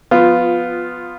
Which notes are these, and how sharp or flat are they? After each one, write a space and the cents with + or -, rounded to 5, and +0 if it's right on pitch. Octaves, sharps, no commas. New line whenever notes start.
F3 +20 B3 +10 F4 +0